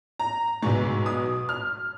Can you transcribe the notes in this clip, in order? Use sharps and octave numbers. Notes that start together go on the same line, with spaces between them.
A#5
B1 B2 G#3 C#6
D#6
F6